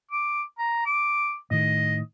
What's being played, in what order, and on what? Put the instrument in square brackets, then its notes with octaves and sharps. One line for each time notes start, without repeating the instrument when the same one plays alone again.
[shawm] D6
A#5
D6
[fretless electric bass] A2 D#3 [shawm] D#5